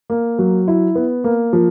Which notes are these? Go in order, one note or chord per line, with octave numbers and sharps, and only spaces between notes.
A#3
F#3
E4
B3
A#3
F3